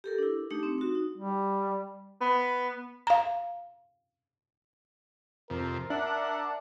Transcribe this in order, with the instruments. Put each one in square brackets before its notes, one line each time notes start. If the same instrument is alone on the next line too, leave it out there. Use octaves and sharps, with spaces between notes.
[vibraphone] G4 A4 A#4
D4 E4
A3 D4 D#4 G4
C4
D#4 F#4
D#4
[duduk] G3
[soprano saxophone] B3
[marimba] F5 A#5
[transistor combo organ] F2 C3 [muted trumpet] A#4
[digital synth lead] D4 [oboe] E5 [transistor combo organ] F#5